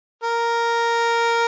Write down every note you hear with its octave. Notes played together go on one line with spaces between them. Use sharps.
A#4